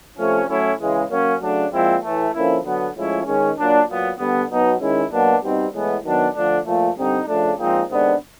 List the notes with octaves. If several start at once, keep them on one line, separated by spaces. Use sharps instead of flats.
C3 F3 A3 C#4
A2 F#3 A3 C#4 E4
C#3 E3 G#3
F#3 A#3 C#4
C#3 F#3 A3 D4
A#2 F3 G#3 C4 E4
A2 E3 A3
D3 F3 A#3 C#4 E4
D3 F#3 B3
A2 F3 G#3 C#4 E4
D#3 G#3 C#4
A#2 F#3 A#3 D4
A#2 F#3 B3
D3 G3 B3
B2 F#3 B3 D#4
D#3 G#3 C#4 E4
B2 F#3 A#3 D4
B2 G3 C4 D#4
A2 E3 G#3 B3
D#3 F#3 B3 D4
D3 F3 A3 D4
A#2 F3 A3
D3 G3 C4 D#4
C#3 F3 A3 D4
A#2 F3 G#3 C4 D#4
C3 D#3 G#3 B3 D4